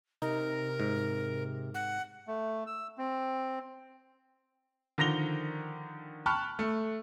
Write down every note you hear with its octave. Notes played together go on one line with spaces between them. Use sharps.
C3 D#4 A#4
G#2
F#5
A3
E6
C4
D3 D#3 F3 A#6 F7 G7
G5 A5 B5 C#6 F6 F#6
A3